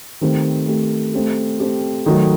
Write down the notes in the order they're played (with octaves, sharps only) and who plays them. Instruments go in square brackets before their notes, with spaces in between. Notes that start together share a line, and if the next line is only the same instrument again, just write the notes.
[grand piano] D#3 [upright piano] A3 C4 G4
[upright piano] A3 C4 G4
A3 C4 G4
A3 C4 G4
[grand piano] D#3 [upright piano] F#3 A3 D#4 A4